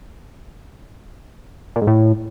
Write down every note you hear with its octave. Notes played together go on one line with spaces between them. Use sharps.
A#2
G#2
A2